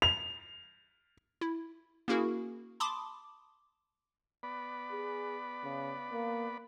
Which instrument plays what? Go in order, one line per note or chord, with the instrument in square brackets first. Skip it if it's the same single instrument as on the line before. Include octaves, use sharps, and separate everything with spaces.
[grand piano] F7
[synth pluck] E4
A#3 C#4 E4 F#4 G#4 A#4
A5 B5 C6 D6 D#6
[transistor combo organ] B3 D5 B5
[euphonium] G#4
C#3
A#3